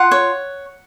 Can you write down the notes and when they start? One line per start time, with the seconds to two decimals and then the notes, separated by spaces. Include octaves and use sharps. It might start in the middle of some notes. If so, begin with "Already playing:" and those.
Already playing: F4 F#5
0.11 C#5